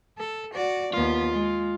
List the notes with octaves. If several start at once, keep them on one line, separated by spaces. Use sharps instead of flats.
A4
F#4 D5
D#2 B3 F4
G#3